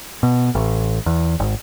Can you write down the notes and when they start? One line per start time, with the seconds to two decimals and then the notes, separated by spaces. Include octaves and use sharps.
0.23 B2
0.55 A1
1.06 E2
1.40 G#1